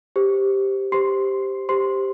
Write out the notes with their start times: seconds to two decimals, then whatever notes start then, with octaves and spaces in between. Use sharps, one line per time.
0.16 G4 C5
0.92 G4 C5 C6 C7
1.69 G4 C5 C6 C7